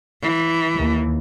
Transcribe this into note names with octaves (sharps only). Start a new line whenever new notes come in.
E3
D#2